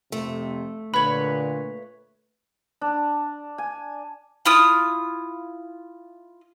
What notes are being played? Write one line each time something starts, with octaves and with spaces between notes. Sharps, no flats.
F2 C3 A3
A#2 D3 B4 C#5 B5
D4
G#5
E4 F4 D#6